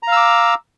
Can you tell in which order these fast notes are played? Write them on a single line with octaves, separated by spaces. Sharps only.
A#5 F5 E6 D6